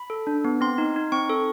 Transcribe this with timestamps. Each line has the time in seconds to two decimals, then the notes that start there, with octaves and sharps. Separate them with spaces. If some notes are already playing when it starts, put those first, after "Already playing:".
Already playing: B5
0.10 A4
0.27 D4
0.45 B3
0.61 C4 C6
0.78 D#4
0.96 D#4
1.12 C4 C#6
1.30 A4